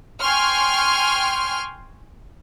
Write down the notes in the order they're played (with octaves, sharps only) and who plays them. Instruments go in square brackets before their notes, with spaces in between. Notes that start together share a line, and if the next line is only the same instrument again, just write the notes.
[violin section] G5 G#5 C6 C#6 F6